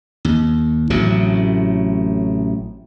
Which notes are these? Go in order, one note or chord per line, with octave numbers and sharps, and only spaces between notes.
D#2
A1 A2 C3 F#3